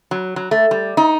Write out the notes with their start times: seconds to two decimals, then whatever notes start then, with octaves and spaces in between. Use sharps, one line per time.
0.11 F#3
0.36 F#3
0.51 A3
0.71 G3
0.97 D#4